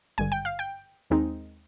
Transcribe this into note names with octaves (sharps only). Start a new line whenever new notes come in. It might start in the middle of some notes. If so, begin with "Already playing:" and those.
G#1 G2 D3 G#5
G5
F5
G5
D#2 D#3 G#3 C4 D#4